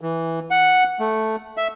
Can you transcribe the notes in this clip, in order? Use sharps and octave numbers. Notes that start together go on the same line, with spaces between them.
E3
F#5
A3
E5